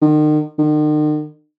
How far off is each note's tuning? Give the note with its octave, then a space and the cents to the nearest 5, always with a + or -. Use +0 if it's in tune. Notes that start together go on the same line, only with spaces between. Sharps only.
D#3 -40
D#3 -45